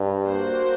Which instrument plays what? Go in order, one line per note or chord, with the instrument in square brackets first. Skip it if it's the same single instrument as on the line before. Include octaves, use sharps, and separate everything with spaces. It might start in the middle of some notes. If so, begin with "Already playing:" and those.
Already playing: [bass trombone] G2
[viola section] A#3 F#4 C5